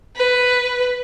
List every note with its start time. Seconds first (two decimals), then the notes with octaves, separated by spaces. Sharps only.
0.16 B4